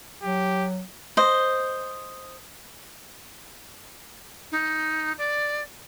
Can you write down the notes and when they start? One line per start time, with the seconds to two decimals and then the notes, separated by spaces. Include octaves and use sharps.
0.23 F#3 G4
1.17 C5 D#5
4.52 D#4
5.18 D5